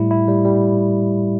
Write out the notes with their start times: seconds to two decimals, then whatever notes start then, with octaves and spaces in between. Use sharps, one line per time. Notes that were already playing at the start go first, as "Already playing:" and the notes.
Already playing: A2 G3 E4
0.11 E4
0.28 G3
0.45 G3